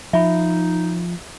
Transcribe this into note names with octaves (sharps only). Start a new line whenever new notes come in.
F3 D#4 E5 B5